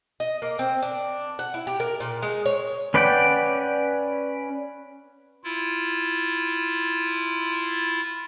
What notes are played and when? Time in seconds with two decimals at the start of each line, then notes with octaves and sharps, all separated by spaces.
0.20 D#5
0.42 A#3
0.59 C4
0.83 D4
1.39 F#5
1.54 E4
1.67 G4
1.80 A#4
2.00 A#2
2.23 G#3
2.46 C#5
2.94 C#4 B4 D5 F#5 G5
5.44 E4 F4